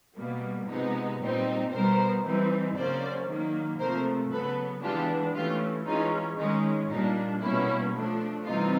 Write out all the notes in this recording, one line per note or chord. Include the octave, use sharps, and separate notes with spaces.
B2 G3 A#3
C3 F3 G#3 B3 D#4
A#2 G3 C4 D#4
B2 G3 B3 A#4 C5
E3 G3 C4 D#4
C#3 F#3 A#3 C#4 C5 D5
D#3 F#3 A#3
C3 F3 A3 A#4 C5
C#3 F#3 B3 A4 B4
E3 G#3 B3 D4 F4 G4
E3 A3 C#4 F4 G4
E3 G#3 C#4 D#4 F4
D#3 G#3 C#4 D#4
A#2 G3 A#3 D4 D#4
B2 G3 A#3 C#4 E4
F3 A3 D4
C3 E3 G3 C4 D#4 F4